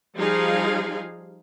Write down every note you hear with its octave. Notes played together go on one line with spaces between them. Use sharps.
F3 G3 D#4 G#4 F5